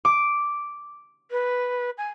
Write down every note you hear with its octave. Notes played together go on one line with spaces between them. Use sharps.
D6
B4
G#5